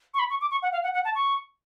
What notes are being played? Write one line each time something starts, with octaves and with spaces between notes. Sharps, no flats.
C#6
B5
C#6
D6
C#6
F#5
F5
F#5
F#5
A5
C#6